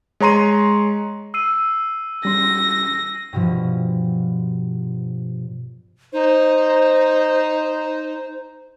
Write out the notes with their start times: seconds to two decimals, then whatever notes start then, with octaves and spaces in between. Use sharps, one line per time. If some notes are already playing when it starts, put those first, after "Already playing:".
0.20 G#3 C#5 A#5 C6 D#7
1.34 E6 C7 D#7
2.25 G3 C#4 C6 A#6
3.33 G2 B2 F3
6.13 D#4 C5